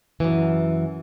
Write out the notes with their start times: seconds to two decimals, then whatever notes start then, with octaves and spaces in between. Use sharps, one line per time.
0.20 F#2 E3